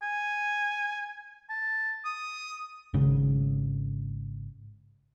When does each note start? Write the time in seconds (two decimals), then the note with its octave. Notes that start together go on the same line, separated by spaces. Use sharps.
0.02 G#5
1.50 A5
2.05 D#6
2.94 G#1 G#2 C#3